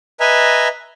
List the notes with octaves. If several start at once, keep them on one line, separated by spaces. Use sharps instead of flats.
B4 D#5 E5 G#5 A#5